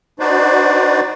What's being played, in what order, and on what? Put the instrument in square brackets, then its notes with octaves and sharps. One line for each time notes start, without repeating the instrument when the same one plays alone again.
[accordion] D4 D#4 F#4 B4 C5 D5